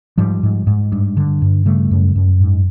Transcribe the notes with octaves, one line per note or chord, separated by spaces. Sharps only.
G#2 F3 G3
G#2
G#2
G2
D3
G2
C#3 G3 A3
F#2
F#2
G#2